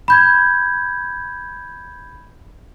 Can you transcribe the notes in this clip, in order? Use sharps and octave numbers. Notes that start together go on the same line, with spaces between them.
B5 G6 G#6